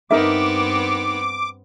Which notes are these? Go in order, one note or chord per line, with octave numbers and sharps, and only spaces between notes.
G2 B3 C4 D#4 A#4 E5 D6